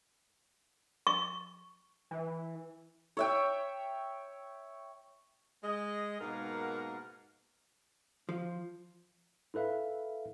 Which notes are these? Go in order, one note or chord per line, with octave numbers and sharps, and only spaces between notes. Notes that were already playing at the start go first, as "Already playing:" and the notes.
C#6
E3
C#5 E5 G5
G#3 D#5
G#2 B2 A#3 A#4 F5 F#5
F3
E4 A4 B4 E5 F5